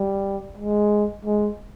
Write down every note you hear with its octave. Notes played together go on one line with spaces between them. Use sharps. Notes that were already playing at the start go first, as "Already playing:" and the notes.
Already playing: G3
G#3
G#3